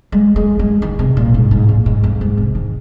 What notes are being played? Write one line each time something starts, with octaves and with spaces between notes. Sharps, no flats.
G#3
G#3
G#3
D#3
C3
A#2
G#2
G#2
A#2
G#2
F2
G#2
C3
D#3